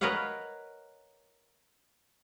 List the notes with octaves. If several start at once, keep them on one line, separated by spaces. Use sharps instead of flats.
A#4 B4 C#5 D#5 F5 F#5